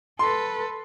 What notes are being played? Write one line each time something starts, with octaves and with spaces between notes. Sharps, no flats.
A4 B4 C6